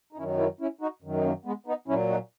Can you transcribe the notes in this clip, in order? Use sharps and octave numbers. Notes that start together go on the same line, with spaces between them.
D#4
F#2 D#3 F#3 C#4 E4
C#4 E4
C#4 E4
D#4 F#4
F#2 D#3 F#3
D#4
A#3 C#4
G#3 B3
B3 D#4
A#2 F#3 C#4 E4
D#4 F#4